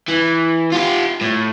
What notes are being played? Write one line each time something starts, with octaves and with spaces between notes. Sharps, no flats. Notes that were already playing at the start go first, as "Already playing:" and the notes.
E3
F4 G4
A2